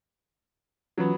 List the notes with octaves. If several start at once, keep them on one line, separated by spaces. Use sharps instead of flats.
E3 F#3 B3 C#4 F4